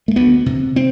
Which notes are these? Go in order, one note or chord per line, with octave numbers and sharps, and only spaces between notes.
A3
D2 B3
C3
C4